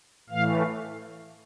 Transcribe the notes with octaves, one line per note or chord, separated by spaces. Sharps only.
A2 E3 A3 F5